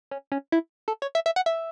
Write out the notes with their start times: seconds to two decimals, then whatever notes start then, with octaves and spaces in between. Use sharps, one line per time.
0.11 C#4
0.32 C#4
0.52 E4
0.88 A4
1.02 C#5
1.15 E5
1.26 E5
1.36 F#5
1.46 E5